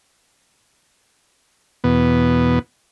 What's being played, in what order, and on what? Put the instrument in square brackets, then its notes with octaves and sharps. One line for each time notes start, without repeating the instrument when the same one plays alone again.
[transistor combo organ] E2 B2 B3